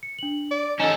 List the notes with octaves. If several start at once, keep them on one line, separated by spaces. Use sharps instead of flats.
C#7
D4 F#7
D5
C#4 D#4 A4 D#5 E7